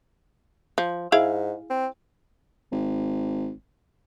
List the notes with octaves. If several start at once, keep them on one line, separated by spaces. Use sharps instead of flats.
F3
G#2 E4 G#4 F5
C4
G#1